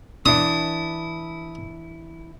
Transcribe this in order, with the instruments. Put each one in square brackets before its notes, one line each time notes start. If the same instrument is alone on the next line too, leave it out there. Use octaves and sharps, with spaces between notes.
[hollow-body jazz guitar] E3 D4 E4 [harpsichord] D#6